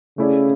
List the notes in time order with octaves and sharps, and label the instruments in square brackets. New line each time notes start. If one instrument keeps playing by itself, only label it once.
[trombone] C#3 [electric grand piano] A3 C#4 E4 G#4 D5